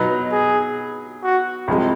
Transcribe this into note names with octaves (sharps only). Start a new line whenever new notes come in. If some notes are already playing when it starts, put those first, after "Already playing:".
Already playing: B2 F#3 B3 D#4
G#4
F#4
C2 C3 F3 G#3